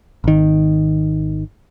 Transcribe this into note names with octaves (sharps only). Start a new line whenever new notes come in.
G#1 D#3